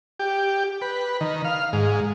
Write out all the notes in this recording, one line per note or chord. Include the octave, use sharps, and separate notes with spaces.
G4
B4
D#3
F5
G#2